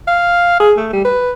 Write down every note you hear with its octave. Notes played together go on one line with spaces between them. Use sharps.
F5
G#4
A3
G3
B4